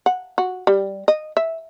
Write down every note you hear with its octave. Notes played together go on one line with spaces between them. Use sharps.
F#5
F#4
G3
D#5
E5